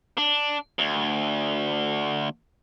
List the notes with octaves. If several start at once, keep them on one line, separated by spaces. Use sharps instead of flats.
D4
D2